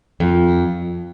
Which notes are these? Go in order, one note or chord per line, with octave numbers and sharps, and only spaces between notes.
F2